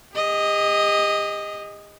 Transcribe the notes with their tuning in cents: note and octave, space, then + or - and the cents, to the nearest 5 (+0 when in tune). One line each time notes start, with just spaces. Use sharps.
G4 +45 D#5 +0